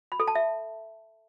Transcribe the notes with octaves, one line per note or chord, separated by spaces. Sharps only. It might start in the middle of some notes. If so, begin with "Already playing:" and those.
B5
A4
A5
E5